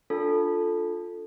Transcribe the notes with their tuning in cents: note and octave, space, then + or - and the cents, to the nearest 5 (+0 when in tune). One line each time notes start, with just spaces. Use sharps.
D4 +0 F4 +15 A4 +0